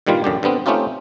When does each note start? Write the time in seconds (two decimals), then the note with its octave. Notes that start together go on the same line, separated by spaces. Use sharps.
0.07 G2 A#2 D#3 G3 F4
0.24 A1 F#2 D3 G4
0.43 G2 D3 B3 C4
0.66 A3 C4 C#4 D#4 F4 G4